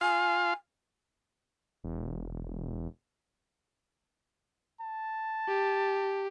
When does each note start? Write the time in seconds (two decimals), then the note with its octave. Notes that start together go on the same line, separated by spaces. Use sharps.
0.01 F4 F5 G#5
1.84 E1
4.81 A5
5.48 G4